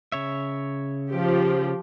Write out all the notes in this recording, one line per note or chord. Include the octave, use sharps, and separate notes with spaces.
C#3 C#5 E5
F3 G4